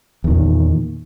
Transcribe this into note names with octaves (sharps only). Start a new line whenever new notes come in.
E2 A#2 D#3